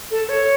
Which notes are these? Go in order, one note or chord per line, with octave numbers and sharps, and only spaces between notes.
A4
C#5